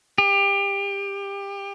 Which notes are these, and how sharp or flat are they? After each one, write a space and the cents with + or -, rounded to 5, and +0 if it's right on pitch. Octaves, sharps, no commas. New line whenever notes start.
G4 +25